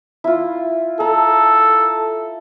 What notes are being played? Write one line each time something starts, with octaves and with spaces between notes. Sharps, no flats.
E4 F4
A4 A#5